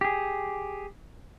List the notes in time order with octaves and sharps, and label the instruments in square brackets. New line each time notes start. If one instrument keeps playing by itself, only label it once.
[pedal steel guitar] G4 G#4